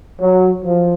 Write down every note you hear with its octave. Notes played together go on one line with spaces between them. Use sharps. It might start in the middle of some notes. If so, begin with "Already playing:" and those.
F#3
F3